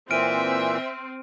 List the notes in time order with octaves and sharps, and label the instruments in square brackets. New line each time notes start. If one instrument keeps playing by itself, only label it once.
[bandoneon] A#2 E3 [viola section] C4 [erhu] E5 [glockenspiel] F6 D7 D#7